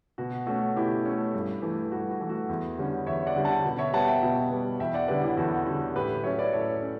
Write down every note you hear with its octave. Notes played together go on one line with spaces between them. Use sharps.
B2 F#4
A3 C#4 F#4
B2 E4 G4
A3 C#4
G2
E3 A3
G2 F#4
F#4
E3 A3
F#4
E2
D3 G3 C#4
E2 C#5 E5
D5 F#5
D3 G3 C#4
F#5 A5
B2
C#5 E5
G3 B3 F#5 A5
E5 G5
B2
G3 B3
E2 E5 G5
D5 F#5
D3 G3 C#4 B4 D5
E4 G4
E2 F#4 A4
D3 G3 C#4 F#4 A4
A2 G4 B4
F#3 C#4 C#5 E5
B4 D5
A2 A4 C#5
C#4